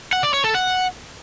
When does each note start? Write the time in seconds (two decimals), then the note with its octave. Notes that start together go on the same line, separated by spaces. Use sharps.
0.13 F#5
0.23 D5
0.34 C#5
0.44 A4
0.55 F#5